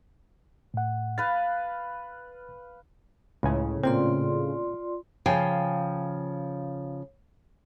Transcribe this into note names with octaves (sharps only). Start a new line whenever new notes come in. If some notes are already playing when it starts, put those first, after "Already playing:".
A2 F#5
B4 F5 A6
C#2 A2 C#3 G#5
A#2 C4 F4 D5 C6
C#3 F3 G5 G#5